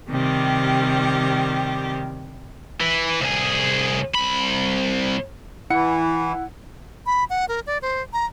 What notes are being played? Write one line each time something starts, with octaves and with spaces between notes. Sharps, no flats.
C3 D#3 G3 G4
E3
C2 G#4
C2 B5
E3 E4 F#5 C#7
B5
F#5
A#4
D5
C5
A#5